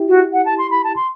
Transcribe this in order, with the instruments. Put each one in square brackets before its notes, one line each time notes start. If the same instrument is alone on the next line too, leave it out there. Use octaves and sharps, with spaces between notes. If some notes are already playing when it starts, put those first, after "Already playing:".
Already playing: [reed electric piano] E4 G4
[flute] F#4
F#5
A5
C6
B5
A5
C6